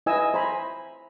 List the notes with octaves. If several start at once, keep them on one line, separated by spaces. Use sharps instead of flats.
E4 B4 D#5 G#5 E6
C5 G#5 A#5 B5